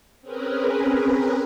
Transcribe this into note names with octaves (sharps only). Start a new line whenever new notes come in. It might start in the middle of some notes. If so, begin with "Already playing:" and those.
C4 C#4 G#4 A#4 B4